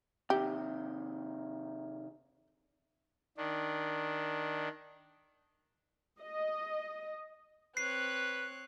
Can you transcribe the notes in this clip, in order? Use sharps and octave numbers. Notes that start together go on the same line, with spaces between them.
C3 D#3 G4
D#3 D4
D#5
C4 B4 C#5 F#6 C7